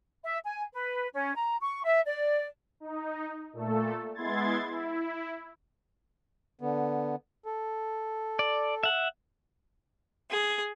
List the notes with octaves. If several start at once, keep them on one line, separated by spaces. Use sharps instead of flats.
E5
G#5
B4
C#4
A#5
C#6
E5
D5
D#4
A#2 A3 A4
G#3 B3 E4 C6 G#6 A6
E4
D3 B3
A4
D5
E5 F#5
G#4